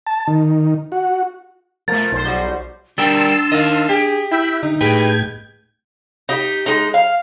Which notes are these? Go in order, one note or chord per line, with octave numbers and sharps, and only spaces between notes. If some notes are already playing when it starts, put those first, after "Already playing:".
A5
D#3
F#4
B2 F3 A3 A#4 A6
B1 C5
F3 G3 F#4
G3 D4 A#4 G5 A5 C6 E6
D#3 D#5 F5
G4 G#4
E4 E5 G5 B5
D3 D#4
A2 G4 G#4 B4 G5 G#6
D#4 G4
G#3 D#4
F5